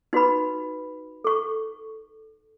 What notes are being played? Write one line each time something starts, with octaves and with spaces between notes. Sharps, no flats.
D#4 F#4 B4 B5
A4 C#6